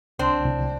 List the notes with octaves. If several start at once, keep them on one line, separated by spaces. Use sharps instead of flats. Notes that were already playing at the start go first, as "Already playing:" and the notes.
C2 C4 D4
C2